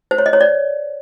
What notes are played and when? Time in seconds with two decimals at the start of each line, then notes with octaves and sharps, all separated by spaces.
0.11 C5
0.18 C#5
0.26 D#5
0.33 C#5
0.41 D5